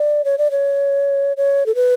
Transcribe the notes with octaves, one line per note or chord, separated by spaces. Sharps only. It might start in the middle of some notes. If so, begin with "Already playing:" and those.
Already playing: D5
C#5
D5
C#5
C#5
A4
B4